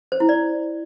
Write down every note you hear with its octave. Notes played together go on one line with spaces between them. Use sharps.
C5
E4
D5